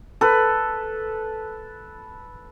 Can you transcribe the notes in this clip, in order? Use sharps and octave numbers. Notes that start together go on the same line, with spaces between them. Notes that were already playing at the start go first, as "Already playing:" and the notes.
A4 B4